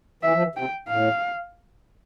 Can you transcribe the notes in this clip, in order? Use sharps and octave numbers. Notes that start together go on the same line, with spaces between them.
E3 E5
F3
E3
C3 G5
A2 F5